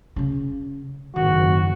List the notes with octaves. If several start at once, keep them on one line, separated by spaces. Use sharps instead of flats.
C#3 C#4
F#1 F2 G#2 D#3 F#4